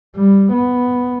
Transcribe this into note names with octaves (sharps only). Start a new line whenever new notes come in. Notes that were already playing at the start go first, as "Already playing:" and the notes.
G3
B3